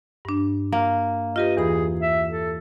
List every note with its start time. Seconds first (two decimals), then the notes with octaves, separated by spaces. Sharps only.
0.25 G2 D4
0.72 A#3
1.36 F4 G4 B4 D#5
1.57 E2 E3 G#4 B5
2.01 E5
2.29 A4